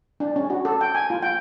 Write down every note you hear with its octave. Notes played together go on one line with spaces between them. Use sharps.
D4
C#4
F#4
A4
G5
G#5
F4
G5